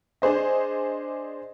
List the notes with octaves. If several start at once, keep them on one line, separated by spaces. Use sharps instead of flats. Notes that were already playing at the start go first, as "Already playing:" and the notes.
D4 G#4 C5 D#5